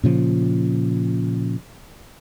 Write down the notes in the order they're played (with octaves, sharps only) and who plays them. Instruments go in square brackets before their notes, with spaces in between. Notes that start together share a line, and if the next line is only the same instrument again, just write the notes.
[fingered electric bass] A#2 C#3 F3